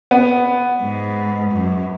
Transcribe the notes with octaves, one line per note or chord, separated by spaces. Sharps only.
B3
G#2
F#2